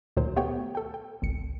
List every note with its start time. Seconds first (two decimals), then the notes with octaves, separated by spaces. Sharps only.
0.17 D2 A#2 D#3 F#3 C5
0.36 A3 B3 G4 C#5 G5
0.75 A4 G5
0.94 G5
1.22 G#1 C#2 C#7